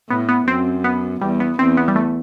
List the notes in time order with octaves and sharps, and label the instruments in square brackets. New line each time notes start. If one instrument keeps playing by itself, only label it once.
[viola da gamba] A2 [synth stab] B3
[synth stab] B3
[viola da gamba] F#2 [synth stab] C4
[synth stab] B3
[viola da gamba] E2 [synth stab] G3
[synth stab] B3
[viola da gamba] E2 [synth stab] C4
[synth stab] B3
G3
A3